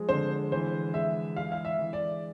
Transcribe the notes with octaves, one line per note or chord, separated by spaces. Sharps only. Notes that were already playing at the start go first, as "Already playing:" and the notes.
Already playing: F3 G#3 F4
D3 C5
E3 C5
G#3 E5
G#4 F5
F5
E5
E3
D5